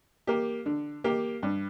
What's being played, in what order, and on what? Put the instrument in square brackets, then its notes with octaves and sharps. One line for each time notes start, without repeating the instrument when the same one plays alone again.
[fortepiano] A#3 G4
D3
A#3 G4
G2